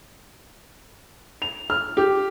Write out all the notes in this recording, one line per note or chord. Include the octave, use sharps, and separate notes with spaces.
F7
F6
G4